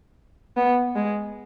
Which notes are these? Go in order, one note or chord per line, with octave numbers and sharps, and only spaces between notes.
B3
G#3